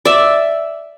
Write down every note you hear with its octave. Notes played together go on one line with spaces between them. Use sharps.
D5 E5